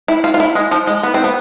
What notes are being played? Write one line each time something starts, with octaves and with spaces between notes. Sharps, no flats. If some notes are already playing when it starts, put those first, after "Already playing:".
E4
F4
F4
E4
G#3
F3
G#3
B3
C4
B3